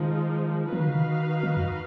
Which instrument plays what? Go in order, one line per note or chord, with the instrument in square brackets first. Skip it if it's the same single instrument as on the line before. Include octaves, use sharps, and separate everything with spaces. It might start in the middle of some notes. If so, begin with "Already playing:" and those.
Already playing: [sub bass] D#3 [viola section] F3 G#3 D#4
[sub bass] F3 [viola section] D#4 F#4 B4 F5
[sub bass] D#3
C#3
D#3
F3
D#3
F#2